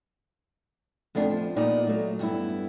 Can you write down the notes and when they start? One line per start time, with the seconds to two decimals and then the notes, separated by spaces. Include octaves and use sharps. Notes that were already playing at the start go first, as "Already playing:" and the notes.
1.15 F2 A3 B3 D4
1.30 F3
1.56 A#2 B3 D#4 D5
1.87 F#3 A3
2.19 G2 B3 E4